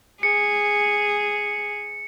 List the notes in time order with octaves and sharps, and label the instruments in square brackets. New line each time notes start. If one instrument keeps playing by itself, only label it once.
[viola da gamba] G#4 [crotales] C#7